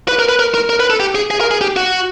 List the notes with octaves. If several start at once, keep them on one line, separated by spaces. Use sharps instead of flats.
B4
A#4
B4
A#4
A#4
A#4
B4
A4
G4
G#4
G#4
A#4
G#4
G4
F#4